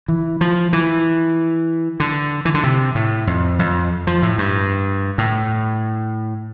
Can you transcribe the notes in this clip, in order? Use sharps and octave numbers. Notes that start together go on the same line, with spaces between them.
E3
F3
E3
D3
E3
D3
C3
A2
F2
F2
F3
A2
G2
A2